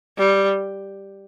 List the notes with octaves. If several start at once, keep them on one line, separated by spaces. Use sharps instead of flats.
G3